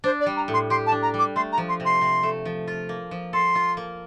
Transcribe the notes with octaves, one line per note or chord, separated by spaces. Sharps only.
D4 C5
D5
G3
A#5
A2
C6
G4 C6
A5
D4
A#5
G3 D6
A3 C6
A#5
F3
C6
C3
C6
C3
A3
F3
F4
A#3
F3
A4 C6
F4
A#3